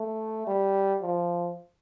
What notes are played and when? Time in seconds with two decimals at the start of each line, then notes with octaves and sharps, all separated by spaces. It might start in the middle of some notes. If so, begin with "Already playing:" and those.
Already playing: A3
0.47 G3
1.02 F3